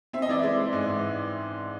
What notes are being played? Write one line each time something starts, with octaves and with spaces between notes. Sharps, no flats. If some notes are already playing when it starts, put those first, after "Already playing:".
C4 E5
D#5
E3 D5 E5
G#3
G#3
G#2
E3